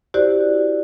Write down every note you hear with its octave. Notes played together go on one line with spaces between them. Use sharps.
E4 F#4 G4 C5 D5